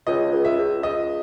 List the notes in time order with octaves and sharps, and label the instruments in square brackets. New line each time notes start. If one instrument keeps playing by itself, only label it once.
[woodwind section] C#2 [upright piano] D#5
[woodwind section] C#2
[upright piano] E5
[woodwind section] C#2
[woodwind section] C#2 [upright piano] D#5